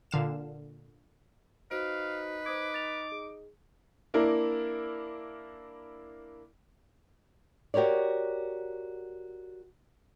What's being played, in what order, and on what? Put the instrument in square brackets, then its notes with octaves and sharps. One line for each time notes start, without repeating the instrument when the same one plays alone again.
[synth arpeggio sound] A#2 D3 F5 E7
[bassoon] D#4 [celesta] F#4 C5 D7 [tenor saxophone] B4 [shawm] F5
[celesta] C5 D#6 G#6 [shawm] D6
[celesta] A6 F7
G#4
[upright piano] A#3 D4 E4 A#4
[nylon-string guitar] F#4 G4 A#4 C#5 D5